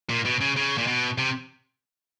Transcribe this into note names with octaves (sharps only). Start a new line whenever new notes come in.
A#2
B2
C#3
C#3
A#2
B2
C3